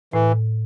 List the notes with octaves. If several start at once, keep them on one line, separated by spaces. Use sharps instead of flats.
A2 E3